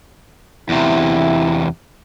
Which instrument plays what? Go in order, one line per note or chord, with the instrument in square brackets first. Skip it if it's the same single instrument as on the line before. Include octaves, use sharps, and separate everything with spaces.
[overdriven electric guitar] E2 C3 [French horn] E4